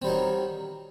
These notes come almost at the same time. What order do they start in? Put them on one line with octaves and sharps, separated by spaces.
C4 G3 F#3 D#3